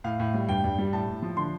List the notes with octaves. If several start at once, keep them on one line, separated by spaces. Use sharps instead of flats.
A2 F5
A2
G3
G2 G5
G2
G3
A2 A5
A2
F3
D3 C6